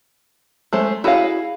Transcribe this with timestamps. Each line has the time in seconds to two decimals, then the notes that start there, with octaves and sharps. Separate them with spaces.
0.73 G#3 A3 C5
1.04 E4 F#4 G#4 D5 F5